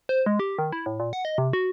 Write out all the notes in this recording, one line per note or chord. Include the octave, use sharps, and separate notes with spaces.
C5
G#3
G4
D#3
E4
A2
A#2
F#5
D#5
C3
F#4